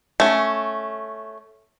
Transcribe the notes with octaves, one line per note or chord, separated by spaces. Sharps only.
A3 C#4